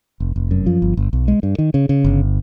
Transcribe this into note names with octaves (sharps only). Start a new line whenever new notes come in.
F1
F1
F#2
F3
G1
G1
B1
G#3
G2
D#3
C#3
C#3
G1